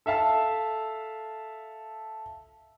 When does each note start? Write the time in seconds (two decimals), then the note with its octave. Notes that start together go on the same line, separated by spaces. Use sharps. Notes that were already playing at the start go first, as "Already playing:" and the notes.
0.06 A4 E5 F5 A5